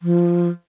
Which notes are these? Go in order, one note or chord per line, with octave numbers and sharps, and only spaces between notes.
F3